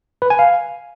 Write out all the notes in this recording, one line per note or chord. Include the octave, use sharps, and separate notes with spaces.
B4
G#5
F5